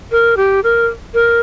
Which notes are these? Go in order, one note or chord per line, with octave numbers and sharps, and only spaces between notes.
A#4
G4
A#4
A#4